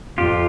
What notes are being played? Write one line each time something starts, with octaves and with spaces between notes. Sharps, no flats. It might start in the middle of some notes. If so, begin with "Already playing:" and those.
F2 F4 G4